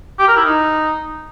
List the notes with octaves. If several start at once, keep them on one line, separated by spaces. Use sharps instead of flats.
G4
A#4
E4
D#4